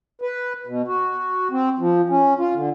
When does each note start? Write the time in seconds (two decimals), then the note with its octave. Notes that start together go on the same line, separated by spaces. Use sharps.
0.22 B4
0.67 B2
0.88 F#4
1.51 C4
1.79 F3
2.09 C#4
2.39 F4
2.54 D3